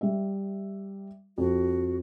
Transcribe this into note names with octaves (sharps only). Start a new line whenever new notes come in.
G3 E5
F2 F#4